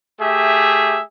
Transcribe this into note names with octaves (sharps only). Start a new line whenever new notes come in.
A3 G4 G#4 E5